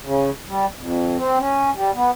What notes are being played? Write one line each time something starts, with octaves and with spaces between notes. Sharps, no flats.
C#3
G3
F2
C4
C#4
G3
B3